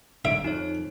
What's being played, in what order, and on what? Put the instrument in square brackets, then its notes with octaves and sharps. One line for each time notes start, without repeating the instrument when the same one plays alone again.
[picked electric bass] G#1 G#2 D3 [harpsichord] E5 [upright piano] D7
[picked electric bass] F2 [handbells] D#4 C#5